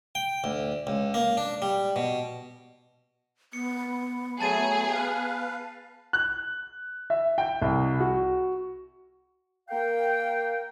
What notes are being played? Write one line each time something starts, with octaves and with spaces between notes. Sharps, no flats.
G5
D2
C#2
A#3
D4
G3
B2
B3 C#7
F#3 A3 G#4 A5 A6 D#7
B4 F5
F#6
E5
G5
C2
F#4
A#3 A#4 F5 G5